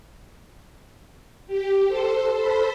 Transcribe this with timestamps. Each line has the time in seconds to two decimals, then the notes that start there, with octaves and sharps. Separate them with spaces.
1.47 G4
1.87 A4 C5
2.33 A4 C5 B5